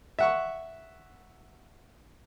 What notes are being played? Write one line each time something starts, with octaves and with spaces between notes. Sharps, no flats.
E5 F#5 C#6